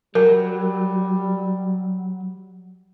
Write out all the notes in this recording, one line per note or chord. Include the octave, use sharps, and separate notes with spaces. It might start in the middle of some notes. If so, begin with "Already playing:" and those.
F#3 G3 A#4